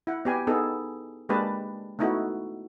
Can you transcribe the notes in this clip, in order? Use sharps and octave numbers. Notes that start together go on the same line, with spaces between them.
E4 F#5
B3 G4 G#5
B3 D#4 G#4 A4
G#3 A#3 D4 G4 B4 A5
A3 B3 D#4 E4 F#4 A4